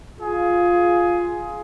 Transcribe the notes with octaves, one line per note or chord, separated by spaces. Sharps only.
F4 G#4